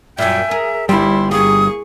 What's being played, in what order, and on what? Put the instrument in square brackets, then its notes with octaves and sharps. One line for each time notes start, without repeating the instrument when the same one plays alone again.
[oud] F#2 A#2 [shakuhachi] E5 [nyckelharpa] G5 G#5
[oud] G#4 [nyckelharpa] A#4
[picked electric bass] G1 G3 [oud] G2 [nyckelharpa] E4 [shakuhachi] C6
[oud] A#3 [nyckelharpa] G#4 C#6 [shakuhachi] D#6